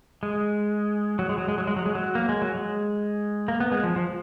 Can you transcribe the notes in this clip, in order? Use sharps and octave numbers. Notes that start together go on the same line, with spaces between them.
G#3
F#3
G#3
F#3
G#3
F#3
G#3
F#3
G#3
F#3
A#3
G#3
F#3
G#3
A#3
B3
G#3
F3
F3